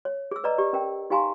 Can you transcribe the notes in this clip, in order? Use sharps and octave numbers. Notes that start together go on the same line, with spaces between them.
C#5
G#4 E6
B4 D5 D#5 A#5
G4 D5
C#4 A#4 G5
D#4 G4 F5 G#5 A#5 C6